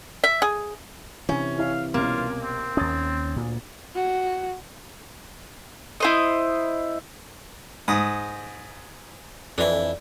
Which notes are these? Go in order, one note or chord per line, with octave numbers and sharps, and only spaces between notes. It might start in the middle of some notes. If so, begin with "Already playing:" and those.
E5
G#4
C3 E3 C#4
E4 C#5 E5 F5
C2 B2 A#3 C#4 F4
C4
D#2 C#4 D#6 G#6 A6
D2 A#2
F#4
E4 C5 D#5
G#2 D#6 A#6
F2 E3 D4 E4